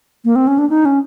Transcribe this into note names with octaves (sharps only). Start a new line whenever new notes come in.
A#3
C4
C#4
D4
D#4
C#4